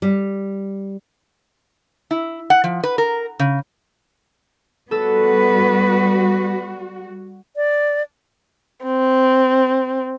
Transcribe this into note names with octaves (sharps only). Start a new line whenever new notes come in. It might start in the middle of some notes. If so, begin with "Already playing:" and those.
G3
E4
F#5
F3
B4
A#4
C#3
G3 B3 F#4 A4 B4 E6
D5
C4